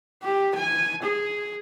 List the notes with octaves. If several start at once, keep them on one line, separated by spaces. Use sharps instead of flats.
G4
G#5
G#4